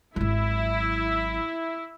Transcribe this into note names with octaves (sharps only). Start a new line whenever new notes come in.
G#1 F#3 E4